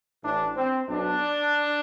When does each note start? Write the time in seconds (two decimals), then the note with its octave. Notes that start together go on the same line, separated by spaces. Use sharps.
0.23 A1 A2 E3 D4
0.56 C4
0.88 B1 B2 D4